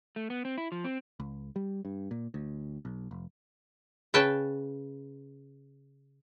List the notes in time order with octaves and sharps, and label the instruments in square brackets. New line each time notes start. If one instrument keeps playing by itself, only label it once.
[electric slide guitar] A3
B3
C4
E4
F3
C4
[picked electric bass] C#2
G3
G2
A#2
D2
B1
F1
[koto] C#3 B4 G5 A5